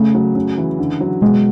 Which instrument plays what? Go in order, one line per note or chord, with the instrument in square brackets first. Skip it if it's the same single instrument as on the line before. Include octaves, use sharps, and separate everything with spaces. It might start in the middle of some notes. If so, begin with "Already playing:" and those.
Already playing: [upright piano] C#3 [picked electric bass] A3
[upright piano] F#3
C#3
E3
D3
F#3
[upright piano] B2 [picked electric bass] G#3